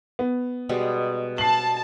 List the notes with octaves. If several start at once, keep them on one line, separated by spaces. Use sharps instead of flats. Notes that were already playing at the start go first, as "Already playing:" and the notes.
B3
B2 G3 G#3
A5 C7 F#7